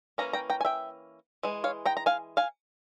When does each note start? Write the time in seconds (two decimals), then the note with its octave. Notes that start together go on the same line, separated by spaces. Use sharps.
0.18 E3 A#3 C#4 A#5
0.33 G5 A#5
0.50 G5 A#5
0.61 G#5
0.65 E5 G5
1.43 E3 G#3
1.64 C#5 F5
1.86 G5 A#5
1.97 A#5
2.06 F5 G#5
2.37 F5 G#5